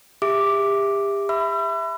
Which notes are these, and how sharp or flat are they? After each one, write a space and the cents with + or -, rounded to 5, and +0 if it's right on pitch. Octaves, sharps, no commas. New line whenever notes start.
G4 +35 E5 +0 D6 +0
E5 +0 B5 +20 E6 +40